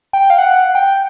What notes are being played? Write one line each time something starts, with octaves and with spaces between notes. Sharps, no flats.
G5
F5
F#5
G5